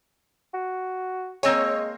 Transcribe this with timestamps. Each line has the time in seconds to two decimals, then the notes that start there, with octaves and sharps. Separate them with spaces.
0.54 F#4
1.43 G#3 A#3 C4 C#5 G#5